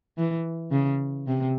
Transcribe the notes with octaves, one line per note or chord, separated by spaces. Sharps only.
E3
C#3
C3